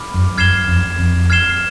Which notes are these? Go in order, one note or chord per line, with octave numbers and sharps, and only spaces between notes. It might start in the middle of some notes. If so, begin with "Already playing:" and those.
Already playing: B5 D6 F6
F#2
F#2 F6 G#6 C7 E7 G7
F2
F2
F6 G#6 C7 E7 G7